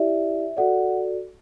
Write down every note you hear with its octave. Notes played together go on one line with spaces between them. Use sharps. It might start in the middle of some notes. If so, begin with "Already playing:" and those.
Already playing: E4 G4 D5 E5
F#4 A4 D5 F#5